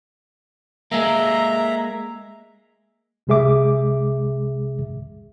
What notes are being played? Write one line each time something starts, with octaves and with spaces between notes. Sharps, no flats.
G#3 A#3 E5 A#5
C2 C3 G#3 G#4 E5 D6